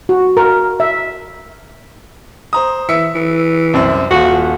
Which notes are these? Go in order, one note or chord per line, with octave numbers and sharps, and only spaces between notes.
F#4
A#4
E5
C5 A#5 D#6
E3 E5 E6 C#7
E3
C2 F#2 C4
D#1 F4 F#4